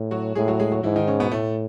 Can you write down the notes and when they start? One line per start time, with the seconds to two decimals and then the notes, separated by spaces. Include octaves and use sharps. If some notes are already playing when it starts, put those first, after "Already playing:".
Already playing: A2
0.11 F#3 F#4
0.35 A2 G#3 G#4
0.48 F#3 F#4
0.59 G#3 G#4
0.72 F#3 F#4
0.83 G#2 E3 E4
0.96 D#3 D#4
1.07 C#3 C#4
1.20 B2 B3
1.31 A2 A3